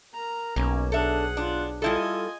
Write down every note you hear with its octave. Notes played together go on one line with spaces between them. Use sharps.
A#4 A#5
B1 A#3 C#4
D4 G#4 A4 E5 F#5
D4 F4
G3 E4 F4 A4 D#5 G#5